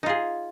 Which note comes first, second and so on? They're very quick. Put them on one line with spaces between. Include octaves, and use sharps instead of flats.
D#4 F4 G#4